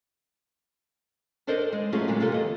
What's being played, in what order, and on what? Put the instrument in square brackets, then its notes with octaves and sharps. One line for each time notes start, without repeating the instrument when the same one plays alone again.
[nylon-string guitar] D4 A4 A#4 C5 D5 D#5
G#3
F#3 A3 A#3 C#4 F4 G#4
A#2 D3 G#3 C4
C3 A#3 F4 G4 A4
E2 D#5